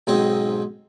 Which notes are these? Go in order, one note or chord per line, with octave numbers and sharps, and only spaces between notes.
B1 G#2 C4 C#4 D#5